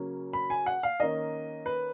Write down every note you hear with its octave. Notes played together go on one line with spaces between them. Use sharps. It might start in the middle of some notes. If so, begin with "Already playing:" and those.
Already playing: C#3 F#3 A#3 C#4
B5
G#5
F#5
F5
D#3 A#3 C#4 D#5
B4